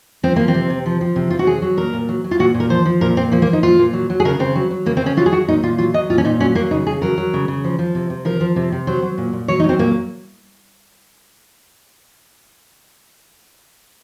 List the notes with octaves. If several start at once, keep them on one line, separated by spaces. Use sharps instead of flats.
F3 C4
F3 A#3
C4
C3
C3
F3
F3
C3
C3 F4
F#4
F#3 G#4
F#3
A#2 A#4
A#2
F#3
F#3
F4
A#2 F#4
A#2
A#4
F3 C5
F3
A#2 A#4
A#2 C4
F3 A#3
A#3
F3
D#4
A#2 F4
A#2
F#3
F#3
G#4
C#3 A#4
C#3 C4
F#3
F#3
C#3 A#3
C4
C#3 C#4
F#3 F4
G#4
F#3 F#4
A#2 D#4
A#2 F4
F#3 F4
F#3 D#5
A#2 F4
C#4
A#2 D#4
F#3 C#4
F#3 A#3
C#3 D#4
C#3 G#4
F#3 A#4
F#3
C#3
C#3
F3
F3
C3
C3
F3 A#4
F3
C3
C3
F#3 C5
F#3
A#2
A#2
F#3 C#5
D#4
F#3
C4
A#2 A#3